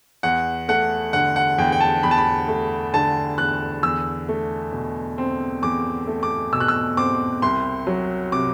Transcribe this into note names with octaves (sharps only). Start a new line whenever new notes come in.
E2 F#5
A3 F#5
D3 F#5
F#5
E2 G5
G5
A5
E2 B5
A5
B5
A3
D3 A5
E2 F#6
E2 E6
A3
B2
C4
E2 D6
A3
D6
B2 E6
F#6
E6
C4 D6
C2 C6
F#3
C3 D6